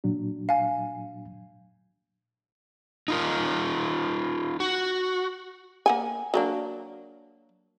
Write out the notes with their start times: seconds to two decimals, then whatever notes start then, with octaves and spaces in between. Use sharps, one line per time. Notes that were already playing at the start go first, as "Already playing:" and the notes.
0.04 A#2 F#3 D4
0.49 F5 G#5
3.08 D#4 F4 A#4
4.60 F#4
5.86 A#3 F#5 G#5
6.34 F#3 A#3 D4